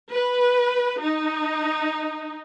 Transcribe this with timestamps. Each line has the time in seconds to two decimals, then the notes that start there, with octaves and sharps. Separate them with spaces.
0.11 B4
1.01 D#4